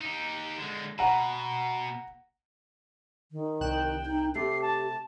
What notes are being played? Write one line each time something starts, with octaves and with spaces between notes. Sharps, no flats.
D#4 G4
D3 G#3
B2 F#5 A#5
D#3
C2 G5 F#6 E7
D#4
C3 A3 G4 C7
A5